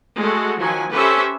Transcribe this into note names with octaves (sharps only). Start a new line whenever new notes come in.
G#3 A3 F#4
D#3 F3 F#3 G#5
C#4 G4 A4 B4 C5 E5